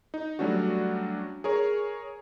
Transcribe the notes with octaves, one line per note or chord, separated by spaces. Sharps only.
D#4
F#3 G3 A3 C#4 D4 F#4
G#4 A#4 C#5